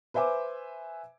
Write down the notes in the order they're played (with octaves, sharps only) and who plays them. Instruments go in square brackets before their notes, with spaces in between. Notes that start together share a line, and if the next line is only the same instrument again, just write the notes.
[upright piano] B4 C5 E5 G#5 D6